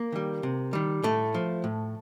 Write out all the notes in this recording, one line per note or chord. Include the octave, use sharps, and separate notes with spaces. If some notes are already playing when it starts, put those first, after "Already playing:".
Already playing: A#3
D#3 G3
C3
D#3 G3
A2 A3
F3
A2